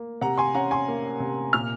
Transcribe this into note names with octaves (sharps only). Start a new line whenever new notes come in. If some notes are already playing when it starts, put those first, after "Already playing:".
Already playing: A#3
C3 F#5 A#5
G#5 C6
C#4 F#5 A#5
G#5 C6
A#3
C3
A#2 F6